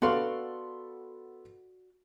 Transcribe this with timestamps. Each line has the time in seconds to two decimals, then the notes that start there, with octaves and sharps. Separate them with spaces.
0.02 B3 F#4 A4 D5 F5 C6